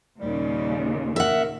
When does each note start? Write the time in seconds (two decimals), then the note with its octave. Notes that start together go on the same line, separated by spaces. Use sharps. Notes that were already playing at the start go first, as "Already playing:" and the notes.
0.20 D#2 A#2 C#3 G3
1.16 A#4 E5 F#5